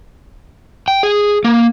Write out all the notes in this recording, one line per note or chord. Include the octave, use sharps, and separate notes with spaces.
G5
G#4
A#3